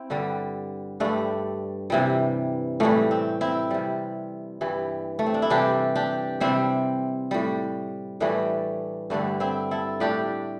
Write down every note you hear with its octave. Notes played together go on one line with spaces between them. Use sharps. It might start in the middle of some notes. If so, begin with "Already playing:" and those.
Already playing: C4 E4
G2 D3 G3
G2 G3 A3 D4
C3 E3 G3
A2 E3 G3 A3
C4
C4 E4
C3 G3
G2 E3 G3
A3
C4
D4
E4
C3 E3 G3 D4 G4
D4 G4
C3 G3 C4 E4
A2 G3
A2 E3 G3 A3 D4
G2 D3 G3 A3 D4
C4 E4
E4 A4
A2 G3 D4 G4